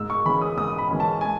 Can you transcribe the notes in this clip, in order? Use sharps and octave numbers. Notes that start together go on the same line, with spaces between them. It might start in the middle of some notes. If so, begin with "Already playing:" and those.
Already playing: G#2 E6
C#6
E3 G#3 C#4 B5
D#6
G#2 D#6
B5
E3 G#3 C#4
A5
G#5